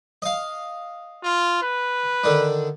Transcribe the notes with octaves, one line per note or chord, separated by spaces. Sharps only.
D#5 F5
F4
B4
D3 D#3 D4